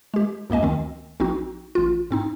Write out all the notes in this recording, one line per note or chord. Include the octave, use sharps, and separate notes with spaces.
G#3 G4
C#2 F#2 A#3 D#5 G#5
D2 D#3 C4
A#1 C4 D#4 F#4
A1 F4
G#2 C4 D#4